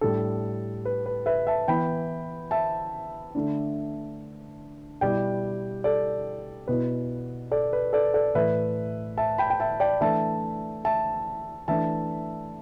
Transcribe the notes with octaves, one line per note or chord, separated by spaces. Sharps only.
A2 G3 D4 A4
B4
B4
B4 E5
E5 A5
E3 B3 E4 G5 B5
E5 A5
D3 A3 D4
B2 G3 E4 D5 G5
A4 D5
B2 B3 E4 B4
A4 D5
B4
A4 D5
A4 D5
A2 E3 A3 B4 E5
E5 A5
G5 B5
G5
E5 A5
D5 G5
E3 A3 D4 E5 A5
E5 A5
E3 A3 D4 E5 A5